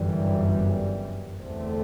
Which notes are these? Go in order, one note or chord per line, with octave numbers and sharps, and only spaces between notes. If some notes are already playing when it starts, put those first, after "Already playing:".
Already playing: G1 F#2 E3 G3
E2 D3 A3 C4